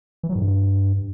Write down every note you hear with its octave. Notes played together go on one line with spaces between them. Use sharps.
E3
F#3
G#2
G2